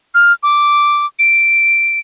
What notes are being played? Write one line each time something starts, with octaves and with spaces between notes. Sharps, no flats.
F6
D6
D7